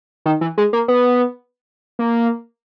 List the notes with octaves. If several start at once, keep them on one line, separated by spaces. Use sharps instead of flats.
D#3
E3
G#3
A#3
B3
A#3